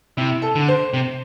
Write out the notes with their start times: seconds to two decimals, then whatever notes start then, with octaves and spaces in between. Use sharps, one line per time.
0.17 C3 E4
0.42 A4
0.55 D3
0.68 C5
0.94 C3